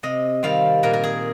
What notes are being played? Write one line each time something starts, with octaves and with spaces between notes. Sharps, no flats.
C3 D#5
D#3 G3 C4 F5
A#2 A#4
A#4
G#4